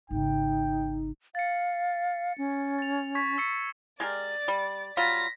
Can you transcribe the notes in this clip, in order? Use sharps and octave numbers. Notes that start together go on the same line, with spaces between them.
G#1 C#3 D#4 G5
F5 A6 C#7
C#4
A6 F7
C#6 G#6 B6
E6 C7 C#7
G#3 G4 A#4 D5 A6
G3
F#3 G3 F4 A#6 B6